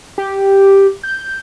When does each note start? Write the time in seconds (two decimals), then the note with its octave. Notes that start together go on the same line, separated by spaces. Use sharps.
0.18 G4
1.03 G6